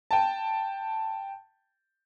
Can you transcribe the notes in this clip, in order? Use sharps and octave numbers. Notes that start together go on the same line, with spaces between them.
G5 A5